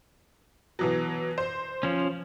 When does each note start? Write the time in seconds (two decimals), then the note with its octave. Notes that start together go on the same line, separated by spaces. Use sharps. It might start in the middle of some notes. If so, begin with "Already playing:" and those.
0.79 B2 E3 F#3
1.38 C5
1.83 F3 C#4